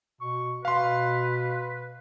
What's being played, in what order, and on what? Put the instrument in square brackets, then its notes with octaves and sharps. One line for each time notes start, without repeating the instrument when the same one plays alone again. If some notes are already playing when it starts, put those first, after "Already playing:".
[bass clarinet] B2 [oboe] C#6
[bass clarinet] B2 [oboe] B4 [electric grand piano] F5 C6